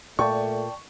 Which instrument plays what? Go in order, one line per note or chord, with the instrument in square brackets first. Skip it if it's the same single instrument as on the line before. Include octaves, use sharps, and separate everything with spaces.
[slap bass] A#2 [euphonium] A3 [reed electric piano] D5 G5 A5 [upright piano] C#6